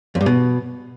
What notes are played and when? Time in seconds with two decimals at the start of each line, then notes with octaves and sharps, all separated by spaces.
0.15 F2
0.21 G2
0.26 B2